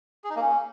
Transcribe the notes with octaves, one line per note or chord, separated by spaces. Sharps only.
G#4
D#4
A#3
C#4